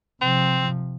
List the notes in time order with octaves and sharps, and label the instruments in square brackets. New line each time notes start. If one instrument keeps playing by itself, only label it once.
[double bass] C3 F3 [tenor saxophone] C4